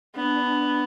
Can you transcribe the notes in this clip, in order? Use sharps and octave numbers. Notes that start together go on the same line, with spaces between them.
B3 D4